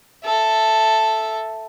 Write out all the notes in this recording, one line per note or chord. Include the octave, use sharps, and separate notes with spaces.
A4 E5